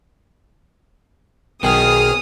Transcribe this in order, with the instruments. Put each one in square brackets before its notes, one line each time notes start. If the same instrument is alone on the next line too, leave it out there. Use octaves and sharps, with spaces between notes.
[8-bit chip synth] B1 G#4 F6 [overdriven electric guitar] B2 [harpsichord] D#3 [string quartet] D#6